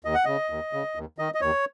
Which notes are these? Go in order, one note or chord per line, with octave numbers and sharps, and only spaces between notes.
D#2 D#5
F#5
C#3 D#5
D#2
C#3
D#2
D#3 D#5
D#5
D#2 C#5